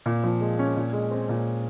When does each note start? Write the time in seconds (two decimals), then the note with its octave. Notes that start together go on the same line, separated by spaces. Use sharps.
0.06 A#2
0.24 F3
0.41 G#3
0.59 C#4
0.76 A#2
0.93 G#3
1.11 C4
1.29 A#2